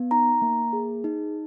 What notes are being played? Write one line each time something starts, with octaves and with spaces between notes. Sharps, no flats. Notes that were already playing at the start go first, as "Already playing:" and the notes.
Already playing: B3
D#4 A#5
A#3
G#4
D#4